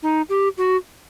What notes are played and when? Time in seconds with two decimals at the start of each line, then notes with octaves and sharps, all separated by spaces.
0.03 D#4
0.29 G4
0.58 F#4